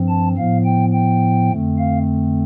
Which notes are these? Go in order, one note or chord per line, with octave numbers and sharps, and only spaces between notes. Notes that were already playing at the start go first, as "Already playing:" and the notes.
Already playing: G2 F3 C4
A5
A2 F3 B3 F5
G5
G5
F2 D3 A3 C4
F5